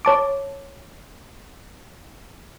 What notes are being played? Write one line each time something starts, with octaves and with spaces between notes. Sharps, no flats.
C#5 A5 D6